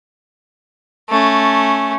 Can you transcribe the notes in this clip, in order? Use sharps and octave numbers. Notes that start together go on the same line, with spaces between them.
A3 C#4